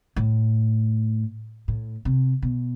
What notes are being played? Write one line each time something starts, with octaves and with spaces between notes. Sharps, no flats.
A2
A2
C3
B2